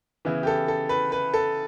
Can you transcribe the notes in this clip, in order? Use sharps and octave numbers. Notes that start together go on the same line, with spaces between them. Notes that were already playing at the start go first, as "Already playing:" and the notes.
C#3 E3 B3 E4
G4
A4
A4
B4
B4
A4